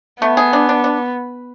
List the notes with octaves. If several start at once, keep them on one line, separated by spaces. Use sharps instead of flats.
A3 B3
G#4
D4
D4
D4